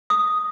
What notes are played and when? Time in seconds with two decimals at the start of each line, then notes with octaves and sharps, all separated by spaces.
0.10 D#6